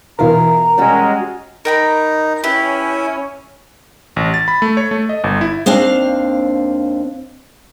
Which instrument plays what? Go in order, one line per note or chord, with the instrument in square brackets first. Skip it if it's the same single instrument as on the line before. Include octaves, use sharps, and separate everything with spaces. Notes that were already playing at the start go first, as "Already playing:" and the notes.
[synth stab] B2 E3 A#4 [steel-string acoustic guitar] E4 F4 G#4 [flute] A#5
[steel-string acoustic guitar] G3 F#4 [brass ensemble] G#3 C#4
[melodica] D#4 [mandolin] A#4 G5 B5
[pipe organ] C#4 [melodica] E4 [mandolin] G4 B4
[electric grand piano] A1
A6
B5
A3
C#5
A3
D#5
G1
E4
[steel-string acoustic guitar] D#2 C4 D4 F5